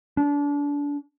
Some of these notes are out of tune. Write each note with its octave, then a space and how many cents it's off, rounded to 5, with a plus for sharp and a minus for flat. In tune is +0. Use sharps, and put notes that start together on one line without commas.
D4 -30